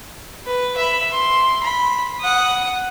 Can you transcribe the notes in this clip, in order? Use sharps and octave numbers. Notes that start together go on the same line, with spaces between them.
B4
E5 B5
C6
B5
F#5 D#6